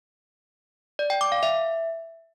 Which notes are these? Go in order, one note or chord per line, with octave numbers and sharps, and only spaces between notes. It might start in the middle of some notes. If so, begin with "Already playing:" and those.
D5
G5
D6
F5
E5